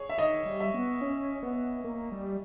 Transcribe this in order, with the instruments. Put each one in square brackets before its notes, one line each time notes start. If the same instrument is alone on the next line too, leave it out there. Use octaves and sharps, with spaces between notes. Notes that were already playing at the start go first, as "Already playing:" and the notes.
Already playing: [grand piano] G#4 C#5
E5
[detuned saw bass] D#3 [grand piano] D#5
[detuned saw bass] G3
[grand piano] E5
[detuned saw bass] B3
C#4
B3
A#3
G3